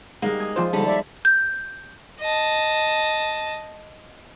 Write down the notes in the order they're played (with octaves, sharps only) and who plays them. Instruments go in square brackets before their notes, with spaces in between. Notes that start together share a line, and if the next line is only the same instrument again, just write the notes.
[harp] G3 G#3 D#4 [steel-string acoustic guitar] A#3
[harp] G#5 D#6
[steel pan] F3 F4 C5
[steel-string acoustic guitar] D#2 G3 A4 [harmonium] D3
[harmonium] D5 E5
[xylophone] G6
[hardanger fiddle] D#5 A5